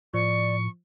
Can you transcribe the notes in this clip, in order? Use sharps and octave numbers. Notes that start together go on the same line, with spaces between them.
A2 F3 D5 C#6